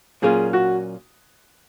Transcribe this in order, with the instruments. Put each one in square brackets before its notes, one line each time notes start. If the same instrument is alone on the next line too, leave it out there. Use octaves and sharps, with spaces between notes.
[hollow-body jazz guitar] A#2 F#3 A#3 C#4 F4 [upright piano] G#4
[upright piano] F#4